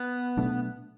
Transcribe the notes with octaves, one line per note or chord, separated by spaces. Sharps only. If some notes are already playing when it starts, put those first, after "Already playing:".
Already playing: B3
B2 F#3 A3 D4